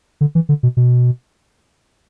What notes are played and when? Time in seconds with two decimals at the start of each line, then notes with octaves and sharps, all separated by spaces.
0.21 D3
0.35 E3
0.49 D3
0.63 B2
0.77 B2